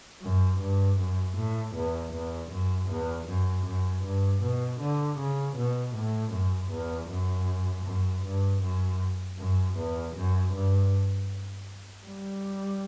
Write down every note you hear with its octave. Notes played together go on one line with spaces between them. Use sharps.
F#2
G2
F#2
A2
E2
E2
F#2
E2
F#2
F#2
G2
B2
D3
C#3
B2
A2
F#2
E2
F#2
F#2
G2
F#2
F#2
E2
F#2
G2
G3